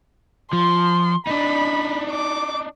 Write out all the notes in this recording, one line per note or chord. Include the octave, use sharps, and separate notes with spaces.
F3 C6
D4 D#4 B5
D6